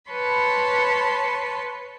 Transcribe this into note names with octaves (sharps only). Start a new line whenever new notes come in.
B4 C#5 A5 B5 C6